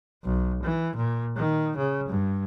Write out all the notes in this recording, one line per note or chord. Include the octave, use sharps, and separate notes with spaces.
B1
E3
A#2
D#3
C#3
G2